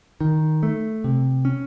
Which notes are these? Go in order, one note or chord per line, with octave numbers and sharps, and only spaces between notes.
D#3
A3
C3
C#4